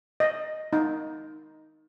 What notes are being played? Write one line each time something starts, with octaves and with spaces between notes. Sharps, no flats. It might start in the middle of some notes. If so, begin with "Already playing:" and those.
D#5
D#4